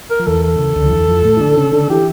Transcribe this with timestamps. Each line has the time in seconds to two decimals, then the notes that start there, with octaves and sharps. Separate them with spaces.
0.10 A#4
0.19 F3
0.27 E2 E3 A4
0.43 A4
0.59 C#3
0.76 D2 D3
0.86 F3
0.92 E2 E3
1.08 F2 F3
1.25 A2 A3
1.37 E4
1.41 D3 D4
1.57 C#3 C#4
1.73 D3 D4
1.90 E3 E4 G4